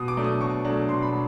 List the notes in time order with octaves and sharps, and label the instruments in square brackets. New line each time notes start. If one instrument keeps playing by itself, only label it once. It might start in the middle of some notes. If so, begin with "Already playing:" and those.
Already playing: [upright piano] B2 D#6
D6
F#3 A3 D4
D#6
B2 C#6
F#3 A3 D4
B2 C6
B5
F#3